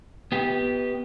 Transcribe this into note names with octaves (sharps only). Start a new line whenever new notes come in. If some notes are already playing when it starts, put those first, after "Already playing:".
B3 G4